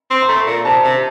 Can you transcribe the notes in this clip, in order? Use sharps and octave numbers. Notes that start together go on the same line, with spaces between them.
C4
C6
A3 A#5
A#2
C3 A5
C3